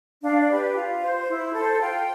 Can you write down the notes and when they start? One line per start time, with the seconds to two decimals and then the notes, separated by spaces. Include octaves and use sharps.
0.23 D4 F5
0.41 D5
0.50 G4 B4
0.76 F4
1.02 C5
1.28 E4
1.54 A4 C5
1.80 F4 G5